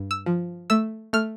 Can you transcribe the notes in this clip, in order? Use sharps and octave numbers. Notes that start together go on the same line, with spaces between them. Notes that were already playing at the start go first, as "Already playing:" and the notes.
Already playing: G2
E6
F3
A3 E6
A3 F6